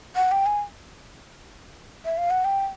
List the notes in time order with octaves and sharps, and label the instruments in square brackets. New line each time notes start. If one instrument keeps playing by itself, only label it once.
[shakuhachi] F#5
G5
G#5
E5
F5
F#5
G5